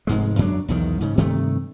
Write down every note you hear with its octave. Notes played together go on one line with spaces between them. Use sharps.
F1 G#2 G#3
F#2 F#3 D4
B1 E2 D#3
G#2 C#3
G2 C3 D#3 A3